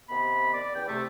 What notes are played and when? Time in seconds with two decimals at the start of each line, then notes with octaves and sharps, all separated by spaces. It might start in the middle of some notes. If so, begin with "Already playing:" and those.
0.09 C3 D#3 B3 B5
0.53 D5
0.75 E2 C#4 G5
0.88 C3 A3